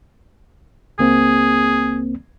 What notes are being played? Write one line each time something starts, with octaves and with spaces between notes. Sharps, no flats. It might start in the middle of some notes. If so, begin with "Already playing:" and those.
C#2 A#3 C4 G#4